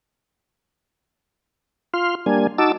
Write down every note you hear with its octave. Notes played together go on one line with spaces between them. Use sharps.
F4 C6 F6
G3 A#3 D4 G#5
D#4 F#4 A5 D6 E6